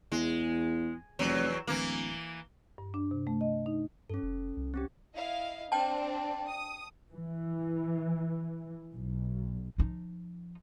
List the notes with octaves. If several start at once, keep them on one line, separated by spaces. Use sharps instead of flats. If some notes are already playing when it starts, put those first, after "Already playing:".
E2 G#3
F1 E2 F#3
D1 E3 A#3
G2
D4
C3
A3
D#5
D#4
G2 C#4 A4
F1
C2
C4 C#4 G4
E4 D#5 F5
C4 D4 D5 G5 A5
D#6
E3
B1
F3 D#4